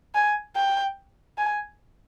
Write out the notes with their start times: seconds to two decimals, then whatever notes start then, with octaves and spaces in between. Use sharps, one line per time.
0.15 G#5
0.56 G5
1.38 G#5